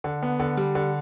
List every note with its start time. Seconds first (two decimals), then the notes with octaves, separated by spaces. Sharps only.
0.04 D3
0.22 B3
0.40 D3
0.57 G3
0.75 D3